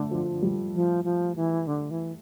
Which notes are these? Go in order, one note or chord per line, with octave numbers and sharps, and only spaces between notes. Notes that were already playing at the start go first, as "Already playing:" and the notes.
Already playing: D3 A3
F3
G3
F3
F3
E3
D3
E3